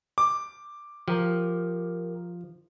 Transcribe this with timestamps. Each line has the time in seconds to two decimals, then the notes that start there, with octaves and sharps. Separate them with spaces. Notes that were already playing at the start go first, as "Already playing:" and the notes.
0.18 D6
1.08 F3 G4 A#4